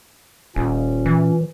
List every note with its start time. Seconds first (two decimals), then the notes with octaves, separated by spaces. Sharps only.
0.56 D#1 A#2 C#4
1.06 E3